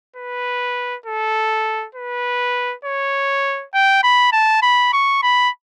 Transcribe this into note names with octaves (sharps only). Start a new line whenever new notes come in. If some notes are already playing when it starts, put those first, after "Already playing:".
B4
A4
B4
C#5
G5
B5
A5
B5
C#6
B5